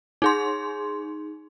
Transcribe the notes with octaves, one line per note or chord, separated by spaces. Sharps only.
D#4 G#4 C6